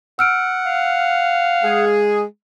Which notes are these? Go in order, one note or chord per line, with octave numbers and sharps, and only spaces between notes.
F#5 E6 F6 D7
F5
G#3 G#4